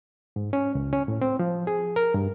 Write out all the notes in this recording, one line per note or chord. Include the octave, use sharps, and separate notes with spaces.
G#2
C#4
C#2
C#4
A2
C4
F3
G#4
A#4
G2